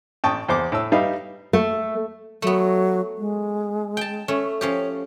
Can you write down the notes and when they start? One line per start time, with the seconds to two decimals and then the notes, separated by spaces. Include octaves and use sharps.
0.24 A1 G5 A5 C#6 D#6
0.49 E2 C5 D6
0.72 A2 E6
0.92 G3 B3 D#4 E5 F5
1.53 A3
2.42 F#3 A3 B3
3.18 G#3
3.97 G5 A5
4.28 A3 C#4
4.61 F3 C#4 G4 C#5